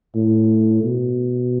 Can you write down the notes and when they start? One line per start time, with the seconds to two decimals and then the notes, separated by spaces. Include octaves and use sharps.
0.15 A2
0.84 B2